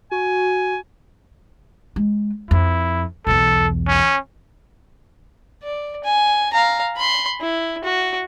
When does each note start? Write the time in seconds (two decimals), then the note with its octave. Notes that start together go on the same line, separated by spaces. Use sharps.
0.12 F#4 G#5
1.96 G#3
2.51 F2 E4
3.27 B1 E2 A4
3.88 C#4
5.63 D5
6.04 G#5
6.53 F5 A#5
6.97 B5 C6
7.41 E4
7.84 F#4